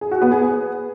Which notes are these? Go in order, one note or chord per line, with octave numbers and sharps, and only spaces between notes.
G#4
F#4
B3
G#4
B4